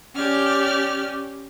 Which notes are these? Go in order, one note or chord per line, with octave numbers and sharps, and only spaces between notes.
C#4 G4 D5 F6